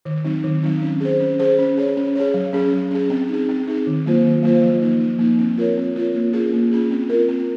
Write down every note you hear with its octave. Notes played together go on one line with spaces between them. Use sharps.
D#3
F#3 C4 D#4
D#3
F#3 C4 D#4
C#4
G#4 C5
C#4
G#4 C5
C#4
G#4 C#5
C#4
G#4 C#5
F#3
C#4 G#4
F#3
C#4 G#4
C4
D#4 G#4
C4
D#4 G#4
D#3
F#3 A#3 F4 C5
D#3
F#3 A#3 F4 C5
F3
A#3 D#4
F3
A#3 D#4
C4
F4 A#4 C#5
C4
F4 A#4 C#5
A#3
C#4 F4 G#4
A#3
C#4 F4 G#4
C4
F4 A#4
C4